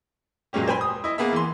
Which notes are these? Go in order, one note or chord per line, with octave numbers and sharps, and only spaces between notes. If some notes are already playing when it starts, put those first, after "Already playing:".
A#2 F#3 G#3 A#3 C#4 G4
C5 G5 G#5 B5
D#6
E4 D#5
A#3 B3 G#4 E5
E3 C6